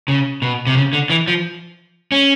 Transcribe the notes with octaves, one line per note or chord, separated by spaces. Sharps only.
C#3
B2
C3
C#3
D3
E3
F3
C#4